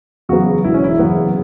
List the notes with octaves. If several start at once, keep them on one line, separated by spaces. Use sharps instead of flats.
E2 C#3 F#3 B3 F#4
E1 E4
C#4
E4
E2 C#3 F#3 B3